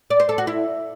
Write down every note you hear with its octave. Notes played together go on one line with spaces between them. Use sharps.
D5
C5
A4
F#4
E4